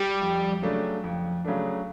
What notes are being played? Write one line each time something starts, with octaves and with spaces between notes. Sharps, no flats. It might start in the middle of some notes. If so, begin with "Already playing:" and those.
Already playing: G3
F2
C#3 F#3 A3 D4
F2
C#3 F#3 A3 D4